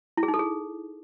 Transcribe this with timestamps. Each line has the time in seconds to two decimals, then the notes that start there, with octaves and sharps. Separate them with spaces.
0.17 E4
0.23 G#4
0.28 D#4
0.34 A4
0.39 G#4